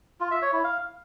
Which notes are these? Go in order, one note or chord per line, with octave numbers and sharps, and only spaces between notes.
F4
E5
C#5
E4
F5